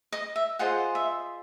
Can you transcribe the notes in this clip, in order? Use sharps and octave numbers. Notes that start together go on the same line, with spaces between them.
D#5
E5
F4 G#4 C5 D#5 F#5
E5